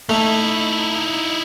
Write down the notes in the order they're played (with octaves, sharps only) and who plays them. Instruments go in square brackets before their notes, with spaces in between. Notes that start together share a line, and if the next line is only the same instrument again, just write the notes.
[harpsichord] A3 [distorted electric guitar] D#4 E4